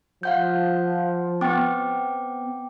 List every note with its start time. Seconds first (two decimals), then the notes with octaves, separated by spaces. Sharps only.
0.23 F3 F5 F#5 G6
1.41 B3 C4 G5 D6